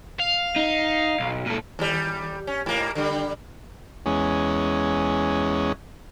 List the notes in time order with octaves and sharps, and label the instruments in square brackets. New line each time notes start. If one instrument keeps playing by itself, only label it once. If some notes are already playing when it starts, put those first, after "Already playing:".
[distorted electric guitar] F5
[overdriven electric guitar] D#4
B1
A#2 A4
[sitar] D#2 G3
C#4
G#2 A#3
D3 G3
[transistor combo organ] E2 G#3 C#4